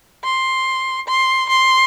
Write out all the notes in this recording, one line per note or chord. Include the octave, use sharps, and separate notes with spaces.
C6
C6
C6